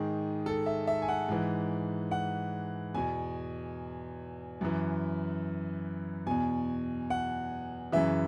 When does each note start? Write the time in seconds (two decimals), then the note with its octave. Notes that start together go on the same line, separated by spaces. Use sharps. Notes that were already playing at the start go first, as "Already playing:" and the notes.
Already playing: G#2 D#3 G#4
0.46 A4
0.66 E5
0.87 E5
1.02 G#5
1.08 F#5
1.28 G#2 E3
2.11 F#5
2.95 E2 B2 G#5
4.61 F#2 E3
6.27 E2 B2 G#5
7.10 F#5
7.92 F#2 C#3 E3 E5